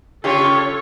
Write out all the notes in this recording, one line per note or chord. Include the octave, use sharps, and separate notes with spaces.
C#3 F4 G4 A4 C#5